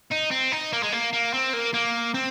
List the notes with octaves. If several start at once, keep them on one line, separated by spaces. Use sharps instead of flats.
D#4
C4
D#4
A#3
G#3
A#3
A#3
C4
A#3
A#3
C4